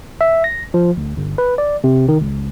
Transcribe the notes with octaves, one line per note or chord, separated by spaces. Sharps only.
E5
A#6
F3
D2
G1
B4
D5
C3
D#3
C#2